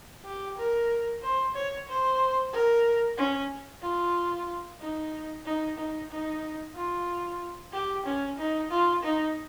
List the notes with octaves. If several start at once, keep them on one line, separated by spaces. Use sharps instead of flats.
G4
A#4
C5
C#5
C5
A#4
C#4
F4
D#4
D#4
D#4
D#4
F4
G4
C#4
D#4
F4
D#4